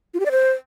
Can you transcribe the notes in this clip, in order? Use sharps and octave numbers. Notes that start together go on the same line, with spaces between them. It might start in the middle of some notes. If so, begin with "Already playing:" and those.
F4
G4
D5
C5